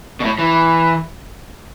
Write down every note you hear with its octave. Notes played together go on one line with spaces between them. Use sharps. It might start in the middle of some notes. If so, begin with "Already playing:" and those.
B2
A2
E3